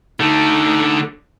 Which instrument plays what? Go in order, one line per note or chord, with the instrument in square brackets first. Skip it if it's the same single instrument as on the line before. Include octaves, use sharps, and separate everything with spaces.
[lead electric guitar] D3 A3 [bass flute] D#4